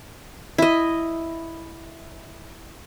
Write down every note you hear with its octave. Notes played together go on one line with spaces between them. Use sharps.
E4 D#5